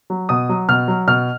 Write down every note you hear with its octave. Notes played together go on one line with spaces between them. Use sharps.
F#3
B2 D#6
F#3
B2 F6
F#3
B2 F6